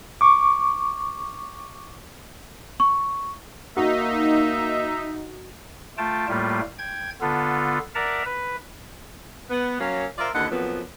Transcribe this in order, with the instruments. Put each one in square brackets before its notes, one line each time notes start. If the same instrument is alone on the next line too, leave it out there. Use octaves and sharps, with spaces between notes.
[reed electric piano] C#6 D6
[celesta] C#6
[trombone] A#3 [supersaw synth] D#4 [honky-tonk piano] F#4 [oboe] E5
[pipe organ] A3 F4 G5 A5
A2 G3 A3 A#3 F4
G5 G#6
D3 B3 F4 A4
A#4 D5 E5 F#5 A5 A#5
B4
[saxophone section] B3
F#3 A#3 C#4
F4 A#4 C5 D5 E5 F5
D#2 D3 E4 B4 D#5 F#5
F2 A#2 F3 F#3 B3